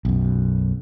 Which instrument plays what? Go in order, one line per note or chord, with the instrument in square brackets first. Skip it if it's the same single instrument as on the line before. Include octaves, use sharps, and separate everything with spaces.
[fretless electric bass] B1 F#2